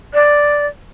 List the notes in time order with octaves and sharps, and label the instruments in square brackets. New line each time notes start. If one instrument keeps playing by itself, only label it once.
[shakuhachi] D5